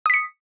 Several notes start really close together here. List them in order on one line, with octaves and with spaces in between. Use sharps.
D#6 B6 C#7